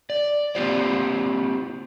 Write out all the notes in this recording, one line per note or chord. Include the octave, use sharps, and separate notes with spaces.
D5
A#3 C4 F4 G4 C5 D5